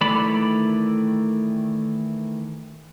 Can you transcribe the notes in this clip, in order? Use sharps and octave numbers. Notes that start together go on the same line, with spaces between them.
D#3 E3 A3 D5 B5